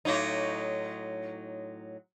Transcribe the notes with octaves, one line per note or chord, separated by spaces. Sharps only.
A2 F#3 D#4